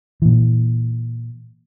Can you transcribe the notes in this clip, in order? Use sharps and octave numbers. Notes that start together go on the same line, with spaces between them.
A#2 E3